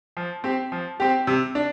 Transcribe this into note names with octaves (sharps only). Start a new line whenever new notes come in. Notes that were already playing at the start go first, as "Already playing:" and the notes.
F3
C4 G4
F3
C4 G4
C3
D4